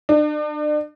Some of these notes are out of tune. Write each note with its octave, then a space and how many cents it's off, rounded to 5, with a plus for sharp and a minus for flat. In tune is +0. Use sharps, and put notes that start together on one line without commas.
D4 +35